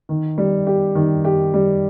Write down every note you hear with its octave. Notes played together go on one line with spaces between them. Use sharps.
D#3
G3
G4
D#3
G4
G3